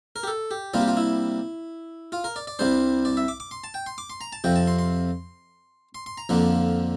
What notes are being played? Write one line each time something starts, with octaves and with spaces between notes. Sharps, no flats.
A#4
G4
A4
G4
C3 G3 A#3 D4 F4
G4
F4
E4
F4
A#4
D5
D5
C2 C3 G3 D4 C5
D5
E5
D6
D6
C6
A5
G5
C6
D6
C6
A#5
A5
F2 C3 F3 G5
A5
C6
C6
C6
C6
A#5
F2 D3 F3 A#3 D4